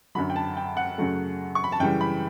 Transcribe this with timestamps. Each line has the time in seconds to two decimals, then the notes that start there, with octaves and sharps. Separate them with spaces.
0.15 F#2 D3 F#3 B5
0.30 G5
0.36 A5
0.57 G5
0.77 F#5
0.98 F#2 C#3 F#3 A3
1.55 C#6
1.64 B5
1.72 A5
1.80 F#2 C#3 E3 G3 G5
2.01 B5